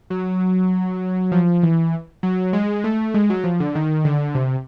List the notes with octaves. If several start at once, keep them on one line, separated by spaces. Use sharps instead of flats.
F#3
F3
E3
F#3
G#3
A3
G#3
F#3
F3
D3
D#3
D3
C3